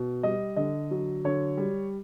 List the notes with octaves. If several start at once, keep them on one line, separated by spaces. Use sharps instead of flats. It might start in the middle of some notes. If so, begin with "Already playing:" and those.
Already playing: B2
G3 D#5
D3 D#5
F#3
D3 C#5
G3